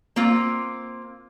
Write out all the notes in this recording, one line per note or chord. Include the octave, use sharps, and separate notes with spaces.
A#3 C4 F4